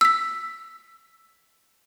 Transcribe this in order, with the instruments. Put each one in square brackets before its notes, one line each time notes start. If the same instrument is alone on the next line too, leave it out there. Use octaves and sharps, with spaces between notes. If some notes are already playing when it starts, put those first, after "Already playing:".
[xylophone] E6 B6